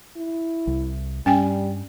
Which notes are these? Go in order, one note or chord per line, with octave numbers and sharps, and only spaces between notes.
E4
C2
G2 G3 C#4 G5 G#5